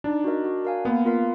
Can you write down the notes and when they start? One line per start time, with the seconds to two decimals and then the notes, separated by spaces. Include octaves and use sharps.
0.04 D4 D#4
0.24 F#4 A#4 D#5
0.44 F#4
0.65 A#4 F5 G#5
0.85 A#3 B3
1.05 F4 A#4 F5